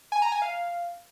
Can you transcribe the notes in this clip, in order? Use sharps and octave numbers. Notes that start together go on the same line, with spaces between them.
G#5
A#5
G#5
F5